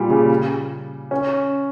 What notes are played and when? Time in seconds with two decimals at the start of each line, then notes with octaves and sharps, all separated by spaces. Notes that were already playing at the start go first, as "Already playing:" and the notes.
Already playing: A#2 G3
0.10 C#3
1.11 C#4